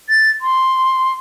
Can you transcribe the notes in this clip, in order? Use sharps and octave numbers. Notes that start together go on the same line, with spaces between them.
A6
C6